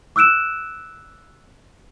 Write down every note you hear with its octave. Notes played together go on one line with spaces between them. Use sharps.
D6 E6 F#6 D7 E7